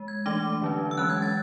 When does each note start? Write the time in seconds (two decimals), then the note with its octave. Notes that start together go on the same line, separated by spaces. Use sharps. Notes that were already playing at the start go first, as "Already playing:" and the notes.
Already playing: G#3
0.08 G#6
0.26 E3 A3 D4 D6
0.62 D3 F#3 C#4
0.91 E6
0.98 E3 G#3 C#4 F#6
1.10 G#6
1.22 A6